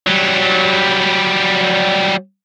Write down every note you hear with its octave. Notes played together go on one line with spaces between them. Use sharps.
F#3 G3